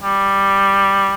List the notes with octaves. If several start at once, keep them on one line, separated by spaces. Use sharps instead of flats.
G3